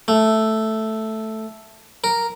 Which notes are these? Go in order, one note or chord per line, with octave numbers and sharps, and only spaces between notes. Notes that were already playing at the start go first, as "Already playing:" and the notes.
A3
A#4